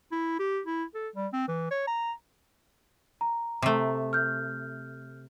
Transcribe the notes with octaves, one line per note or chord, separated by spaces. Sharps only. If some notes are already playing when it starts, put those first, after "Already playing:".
E4
G4
E4
A4
G3
C4
E3
C#5
A#5
A#5
C3 A3
F6 G6